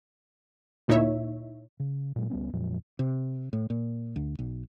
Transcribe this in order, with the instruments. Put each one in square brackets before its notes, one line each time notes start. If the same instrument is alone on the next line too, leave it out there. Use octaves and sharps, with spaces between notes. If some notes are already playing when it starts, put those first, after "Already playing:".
[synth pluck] D2 A#2 D#4 E4 C#5 E5
[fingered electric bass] C#3
A#2 F#3 G#3
C#2 G3 B3 C#4
F2 A#2 F3 F#3
[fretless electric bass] C3
A2
A#2
D2
B1